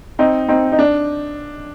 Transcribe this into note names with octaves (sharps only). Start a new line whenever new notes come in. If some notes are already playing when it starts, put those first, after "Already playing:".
C4 D#4
C4 D#4
D#4
D4